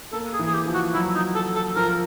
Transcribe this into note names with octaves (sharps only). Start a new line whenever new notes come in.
A#3 A4
G#4
E3
G#4
G4
F3
F#4
F#3 E4
D#4
A4
A4
F3 A#4